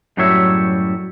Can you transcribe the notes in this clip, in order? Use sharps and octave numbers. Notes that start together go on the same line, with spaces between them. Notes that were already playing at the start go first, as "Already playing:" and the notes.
F#2 A2 F#3 G3 C#5 E5